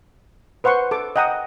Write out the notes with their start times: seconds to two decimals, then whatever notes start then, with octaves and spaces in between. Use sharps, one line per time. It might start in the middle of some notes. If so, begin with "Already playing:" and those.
0.64 B4 C5 F#5 C6 C#6
0.91 A4 D6
1.16 D#5 F#5 G5 A#5 D#6